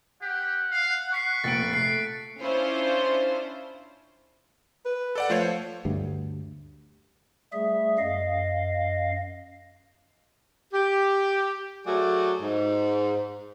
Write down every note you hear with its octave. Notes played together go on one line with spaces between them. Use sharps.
G4 F#5
F5
C#6 F#6 B6 C7
F1 A#2 A6 C#7 D7 F#7
A3 C7
C#4 D4 E4 F4 C5
B4
A4 D5 F#5
F3 A3 C5 C#5
D2 G2 G3
G3 A3 G#4 E5
F#2 D#5 F5
G4
F#3 A3 F#4 G#4 D5
G#2